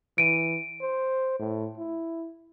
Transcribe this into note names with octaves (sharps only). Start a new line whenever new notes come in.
E3 D7 D#7
C5
A2
E4